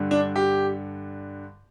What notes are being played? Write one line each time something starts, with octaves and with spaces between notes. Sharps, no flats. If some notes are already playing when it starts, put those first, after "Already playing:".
Already playing: G2 D3
D4
G4